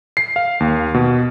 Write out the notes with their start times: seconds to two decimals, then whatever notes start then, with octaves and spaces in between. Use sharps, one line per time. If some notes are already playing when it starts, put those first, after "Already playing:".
0.17 C7
0.36 F5
0.60 D#2
0.94 B2